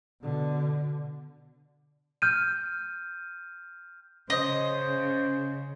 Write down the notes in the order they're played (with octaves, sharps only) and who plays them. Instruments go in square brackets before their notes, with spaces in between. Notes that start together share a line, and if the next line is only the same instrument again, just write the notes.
[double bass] B2 D3
[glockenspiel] F6 G6 D#7
[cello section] C#3 [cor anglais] C5 [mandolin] D#5